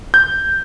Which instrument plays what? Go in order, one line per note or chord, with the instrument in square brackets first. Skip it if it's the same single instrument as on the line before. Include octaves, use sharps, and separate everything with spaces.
[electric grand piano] G6